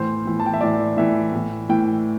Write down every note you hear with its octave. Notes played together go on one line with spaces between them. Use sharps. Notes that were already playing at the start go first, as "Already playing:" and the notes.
Already playing: A2 E3 C5
A2 E3
A5
G5
E5
A2 E3 D5
A2 E3 E5
A2 E3
A2 E3 G5